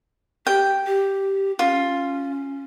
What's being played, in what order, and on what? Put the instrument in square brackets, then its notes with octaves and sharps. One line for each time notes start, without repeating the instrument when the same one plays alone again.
[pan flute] G4 [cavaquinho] G5
[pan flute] G4
[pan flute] C#4 [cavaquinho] F4